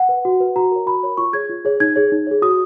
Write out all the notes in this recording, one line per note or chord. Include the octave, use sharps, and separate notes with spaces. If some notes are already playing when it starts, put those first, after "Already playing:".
Already playing: F#5
B4
F#4
B4
F#4 A#5
A#4 C#5
F#4 B5
A#4 C#5
F4 C#6
G#4 C#5 G#6
F4
G#4 C#5
D#4 G#6
G#4 C#5
D#4
G#4 C#5
F#4 D#6